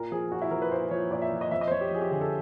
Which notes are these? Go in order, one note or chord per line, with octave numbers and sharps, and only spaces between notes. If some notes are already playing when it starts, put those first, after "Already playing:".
Already playing: A#2 A#4
F3 G#4
A#2 F#4
E4
F3 A#4
B4
A#2 C5
F3 C#5
A#2 D5
E5
F3
D#5
F2 E5
D#5
C5
F2 C#5
G4
F3 G#4
G4
D3 G#4
A4